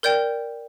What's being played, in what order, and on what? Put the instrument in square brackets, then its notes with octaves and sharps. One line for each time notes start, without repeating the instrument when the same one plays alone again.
[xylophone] A#4 D5 G5 G6